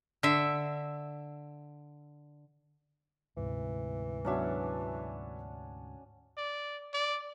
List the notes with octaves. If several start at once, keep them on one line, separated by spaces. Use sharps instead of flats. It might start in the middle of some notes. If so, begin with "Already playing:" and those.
D3 E5
D2 G#2 C3 E3
F#3 B3 C#4 D4 F#4 E5
D5
D5